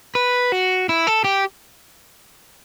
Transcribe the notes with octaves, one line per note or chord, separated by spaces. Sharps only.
B4
F#4
E4
A4
G4